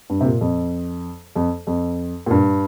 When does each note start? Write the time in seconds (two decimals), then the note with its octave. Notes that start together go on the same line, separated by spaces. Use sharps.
0.10 G2
0.21 C3
0.25 A#2
0.41 F2
1.36 F2
1.67 F2
2.26 A#2
2.31 G2